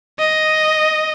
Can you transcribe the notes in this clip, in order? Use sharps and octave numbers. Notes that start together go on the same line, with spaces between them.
D#5